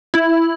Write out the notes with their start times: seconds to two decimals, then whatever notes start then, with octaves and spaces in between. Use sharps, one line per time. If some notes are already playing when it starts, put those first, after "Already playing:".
0.14 E4